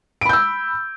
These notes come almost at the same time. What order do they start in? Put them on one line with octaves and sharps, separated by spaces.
D7 B5 G6 E6